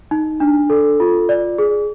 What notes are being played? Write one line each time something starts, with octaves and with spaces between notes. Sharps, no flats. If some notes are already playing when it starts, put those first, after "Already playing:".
D#4
D4
A4
F4
D5
G#4